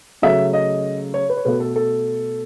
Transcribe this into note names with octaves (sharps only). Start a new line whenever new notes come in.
C#3 F#3 A3 E5
D#5
C#5
B4
C#5
B2 A3 B4
A4
A4